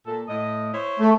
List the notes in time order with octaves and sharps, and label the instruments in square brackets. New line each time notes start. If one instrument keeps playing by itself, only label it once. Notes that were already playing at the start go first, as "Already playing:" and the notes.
[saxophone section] A#2 A4
A2 D#5
E4 C5 C#5
[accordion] A3